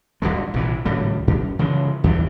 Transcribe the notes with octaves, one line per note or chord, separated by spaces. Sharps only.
D1 G#1 G2 G#3
A#1 C3 E3
G#1 C#2 A2 G3
F#2
C#3 E3 F3 G#3
D#2 E3 G3